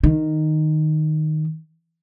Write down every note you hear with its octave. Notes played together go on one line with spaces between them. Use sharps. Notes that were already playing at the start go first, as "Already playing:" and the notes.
D#3